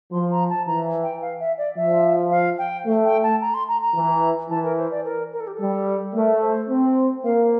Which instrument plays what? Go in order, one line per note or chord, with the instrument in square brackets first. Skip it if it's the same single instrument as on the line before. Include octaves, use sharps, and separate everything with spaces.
[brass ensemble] F3 [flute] C6
[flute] A#5
A5
[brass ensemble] E3 [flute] A#5
[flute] G5
F5
E5
D5
[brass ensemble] F3 [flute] E5
[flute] F5
G5
[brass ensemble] A3
[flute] G5
A5
A#5
C6
A#5
A#5
[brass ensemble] E3
[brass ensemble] E3 [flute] A5
[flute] A#4
C5
D5
A#4
A#4
A4
G4
A4
[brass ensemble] G3
[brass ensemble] A3 [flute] A#4
[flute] C5
[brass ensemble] C4
[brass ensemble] A#3 [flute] F5